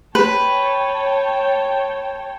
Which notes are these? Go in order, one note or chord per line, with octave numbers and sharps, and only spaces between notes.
B4 C#5 G5 A5